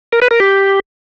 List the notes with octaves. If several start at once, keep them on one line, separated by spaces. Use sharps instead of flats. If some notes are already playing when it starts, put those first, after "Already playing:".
A#4
B4
A#4
G4